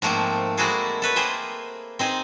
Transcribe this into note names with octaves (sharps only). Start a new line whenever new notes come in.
G#2 F3 A3 A#3 C4
G#3 A#3 E4 F#4 G#4 A4
A4 B4 C#5
A#3 G#4 C5 G5 G#5
C4 D#4 G#4